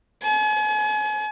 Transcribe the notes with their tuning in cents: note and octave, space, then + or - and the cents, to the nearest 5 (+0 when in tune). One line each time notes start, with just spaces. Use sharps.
G#5 +40